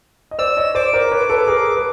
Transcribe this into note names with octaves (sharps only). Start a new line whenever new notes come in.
D#5
C5 D5 E6
C#5 D#5
C5 D5 D6
A#4 C5
B4 C#5
A4 B4
G#4 A#4
B4